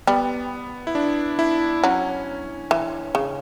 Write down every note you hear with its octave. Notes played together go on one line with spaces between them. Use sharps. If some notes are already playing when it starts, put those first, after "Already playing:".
G3 B3
E4
D4
E4
F#3 C#4
E3
C#3